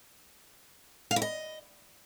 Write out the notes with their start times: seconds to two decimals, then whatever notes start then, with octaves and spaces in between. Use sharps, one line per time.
1.11 F5
1.16 E4
1.22 D#5